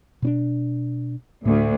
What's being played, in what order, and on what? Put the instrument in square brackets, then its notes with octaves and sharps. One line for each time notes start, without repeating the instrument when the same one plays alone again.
[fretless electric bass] B2 C#4 D4
[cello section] D2 [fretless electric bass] A2